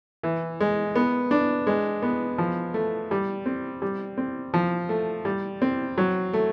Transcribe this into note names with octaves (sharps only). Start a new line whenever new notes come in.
E3
G#3
B3
D4
G#3
B3
F3
A3
G3
C4
G3
C4
F3
A3
G3
C4
F#3
A3